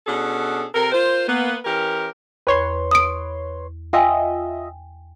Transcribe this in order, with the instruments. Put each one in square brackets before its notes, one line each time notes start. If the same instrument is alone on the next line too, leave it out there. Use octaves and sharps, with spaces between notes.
[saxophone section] B2 C#4 D4 G#4 A4
C3 A4 A#4
F4 A#4 C5
A#3 B3
E3 C#4 G4 A#4
[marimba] E2 [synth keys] B4 C#5 C6
[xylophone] D#6 D7
[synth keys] F4 D#5 E5 [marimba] G5 G#5